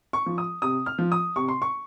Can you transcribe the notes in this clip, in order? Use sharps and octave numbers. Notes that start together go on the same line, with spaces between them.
C#6
F3
D#6
C3 D#6
F6
F3
D#6
C3 C#6
C6
C#6